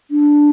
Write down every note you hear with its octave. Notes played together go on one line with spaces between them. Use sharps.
D4